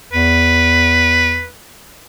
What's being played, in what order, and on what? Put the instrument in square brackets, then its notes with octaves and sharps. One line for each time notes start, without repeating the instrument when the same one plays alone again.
[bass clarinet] E2 [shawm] B4